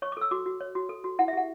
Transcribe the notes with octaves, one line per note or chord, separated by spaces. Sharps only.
C#5 C#6
D6
A4 E6
F#4 D6
F#4
C#5
F#4
A4
F#4
E4 F#5
E5
G4 F#5